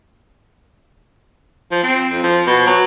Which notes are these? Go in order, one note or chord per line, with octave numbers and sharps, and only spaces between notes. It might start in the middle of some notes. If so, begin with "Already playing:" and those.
F3
C4
F2
F3
B2
F#3